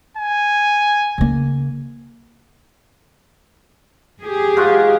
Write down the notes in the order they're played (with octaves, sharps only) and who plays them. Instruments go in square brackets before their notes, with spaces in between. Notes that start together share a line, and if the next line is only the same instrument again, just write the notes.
[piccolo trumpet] G#5
[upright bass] C#3 A#3
[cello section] G4 G#4
[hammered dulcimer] G#2 F4 F#4